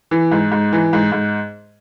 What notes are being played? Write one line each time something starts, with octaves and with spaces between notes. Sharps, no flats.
E3
G#2
G#2
E3
G#2
G#2